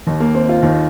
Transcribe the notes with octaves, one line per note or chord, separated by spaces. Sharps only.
D#2 D#3
A#3
C4
F4
D#2 D#3